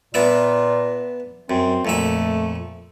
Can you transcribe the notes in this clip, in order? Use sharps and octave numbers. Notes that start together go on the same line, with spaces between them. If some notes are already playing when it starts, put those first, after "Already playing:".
A#2 B3 D4 E5
F#2 C4
F2 A#2 A3 E5